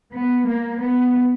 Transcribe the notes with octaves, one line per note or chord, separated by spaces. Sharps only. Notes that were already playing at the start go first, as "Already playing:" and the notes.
B3
A#3
B3